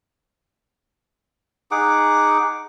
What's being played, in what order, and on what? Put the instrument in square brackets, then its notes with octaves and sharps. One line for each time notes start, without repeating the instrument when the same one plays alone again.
[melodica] D#4 G#4 F#5 D6